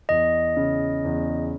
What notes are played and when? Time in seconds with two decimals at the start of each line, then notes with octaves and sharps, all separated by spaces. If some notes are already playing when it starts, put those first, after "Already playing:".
0.09 E2 D#5
0.57 C#3
1.05 E2